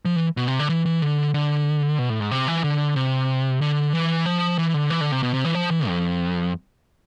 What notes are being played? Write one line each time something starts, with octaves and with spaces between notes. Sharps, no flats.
F3
E3
B2
C3
D3
E3
E3
D3
D3
B2
A2
G#2
C3
E3
D3
C3
D3
E3
F3
E3
D3
E3
D3
C3
B2
C3
E3
F3
E3
F2